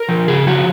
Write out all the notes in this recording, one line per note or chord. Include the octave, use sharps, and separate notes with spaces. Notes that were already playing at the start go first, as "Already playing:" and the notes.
Already playing: A#4
F3
C#3 G#4
F3 F#4